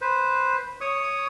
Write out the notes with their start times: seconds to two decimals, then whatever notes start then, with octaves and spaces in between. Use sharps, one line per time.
0.01 B4 C5
0.81 C#5 C#6 D#6